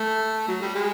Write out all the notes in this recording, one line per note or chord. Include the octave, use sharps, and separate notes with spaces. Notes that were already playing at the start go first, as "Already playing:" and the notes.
Already playing: A3
F#3
G3
G#3